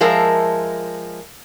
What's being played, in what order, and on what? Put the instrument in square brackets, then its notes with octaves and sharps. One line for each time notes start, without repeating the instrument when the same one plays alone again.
[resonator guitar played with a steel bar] F3 G#3 A#4 E5 A5